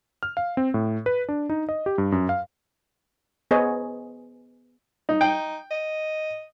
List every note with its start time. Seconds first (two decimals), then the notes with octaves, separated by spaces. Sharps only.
0.23 F6
0.37 F5
0.57 C4
0.74 A2
1.06 B4
1.29 D4
1.49 D#4
1.69 D#5
1.86 G4
1.98 G2
2.12 F#2
2.29 F5
3.51 B3 G#4 C5 C#5 D#5
5.09 D#4
5.21 D#4 G5
5.71 D#5